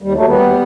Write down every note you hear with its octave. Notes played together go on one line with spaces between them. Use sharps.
D#2 G3
F#3 A3
D#2
G3 B3
D#2